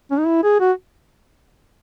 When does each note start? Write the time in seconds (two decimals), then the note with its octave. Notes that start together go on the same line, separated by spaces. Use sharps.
0.11 C#4
0.18 D#4
0.27 E4
0.43 G#4
0.60 F#4